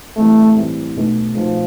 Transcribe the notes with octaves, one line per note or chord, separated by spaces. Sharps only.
A2 E3 G3 A3 C4
A2 E3 G3 C4
B1 B2 A3
B1 B2 F3 A3